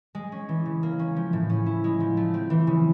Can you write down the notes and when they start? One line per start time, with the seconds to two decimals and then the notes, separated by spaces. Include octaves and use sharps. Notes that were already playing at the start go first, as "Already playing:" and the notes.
0.15 G#3
0.32 C#4
0.49 E3
0.66 C#3
0.83 A#3
0.99 C#4
1.16 F3
1.33 A2
1.49 C#4
1.66 E4
1.84 G#3
2.00 F3
2.17 A3
2.34 C4
2.50 E3
2.67 C#3